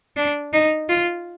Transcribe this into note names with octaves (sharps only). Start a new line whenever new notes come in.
D4
D#4
F4